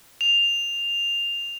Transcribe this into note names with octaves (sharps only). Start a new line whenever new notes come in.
F7